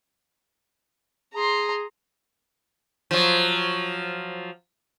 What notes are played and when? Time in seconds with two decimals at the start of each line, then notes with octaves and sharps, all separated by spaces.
1.34 G#4 A#5 C6
3.11 F3 F#3